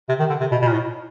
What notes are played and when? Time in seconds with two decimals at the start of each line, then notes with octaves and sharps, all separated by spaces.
0.09 C3
0.19 D#3
0.30 D3
0.40 C3
0.52 B2
0.62 B2
0.67 A#2
0.72 A2